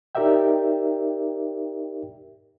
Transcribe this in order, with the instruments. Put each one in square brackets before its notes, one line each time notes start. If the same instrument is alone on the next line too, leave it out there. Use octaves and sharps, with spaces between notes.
[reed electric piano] D#4 G4 A#4 D5 E5 G5